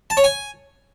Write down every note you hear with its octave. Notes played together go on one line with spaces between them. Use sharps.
A5
C#5
G#5